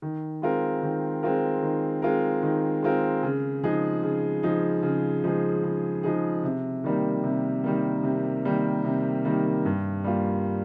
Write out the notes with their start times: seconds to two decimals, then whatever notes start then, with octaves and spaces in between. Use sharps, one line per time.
0.02 D#3
0.42 G#3 C4 F4 A#4
0.83 D#3
1.23 G#3 C4 F4 A#4
1.62 D#3
2.02 G#3 C4 F4 A#4
2.43 D#3
2.83 G#3 C4 F4 A#4
3.23 C#3
3.63 F3 G#3 D#4 G#4
4.03 C#3
4.43 F3 G#3 D#4 G#4
4.83 C#3
5.24 F3 G#3 D#4 G#4
5.63 C#3
6.03 F3 G#3 D#4 G#4
6.43 C3
6.84 D#3 G3 A#3
7.24 C3
7.64 D#3 G3 A#3
8.04 C3
8.45 D#3 G3 A#3
8.85 C3
9.25 D#3 G3 A#3
9.65 G2
10.04 G3 A#3 F4